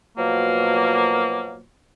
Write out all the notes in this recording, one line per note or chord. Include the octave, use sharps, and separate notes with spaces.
B2 F3 F#3 A#3